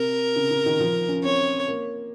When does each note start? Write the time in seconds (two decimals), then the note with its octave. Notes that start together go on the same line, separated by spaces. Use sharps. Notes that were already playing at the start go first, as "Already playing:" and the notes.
Already playing: C3 A#4
0.36 C#3
0.51 C#3
0.66 D#3
0.80 F3
1.08 C#4
1.23 C4 C#5
1.68 A#3